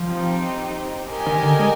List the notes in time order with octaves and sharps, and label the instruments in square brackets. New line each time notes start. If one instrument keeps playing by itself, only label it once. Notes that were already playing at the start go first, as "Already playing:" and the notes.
Already playing: [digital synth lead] F3
[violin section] C4 D#4 G4
G4 A#4 D#5 G#5
[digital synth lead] D#3
D3
G#3